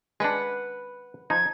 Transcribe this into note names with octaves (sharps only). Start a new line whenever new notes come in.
G#3 D4 B4 F#5
F3 D#4 G#6